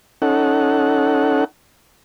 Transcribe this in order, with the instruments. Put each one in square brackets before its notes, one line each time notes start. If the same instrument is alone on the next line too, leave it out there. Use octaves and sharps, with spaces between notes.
[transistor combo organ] C#4 D#4 A4 F#5